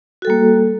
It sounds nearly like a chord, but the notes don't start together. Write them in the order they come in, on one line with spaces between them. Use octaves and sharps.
F#4 A4 G3 A#3